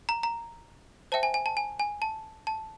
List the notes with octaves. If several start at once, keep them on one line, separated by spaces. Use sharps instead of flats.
A#5
A#5
C5 E5 G5 A5
G#5
G#5
A5
G#5
G#5
A5
A5